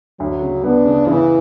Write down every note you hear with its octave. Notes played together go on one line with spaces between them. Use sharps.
D2 F#3
C#3
B3 D4
C#3
C#3 E3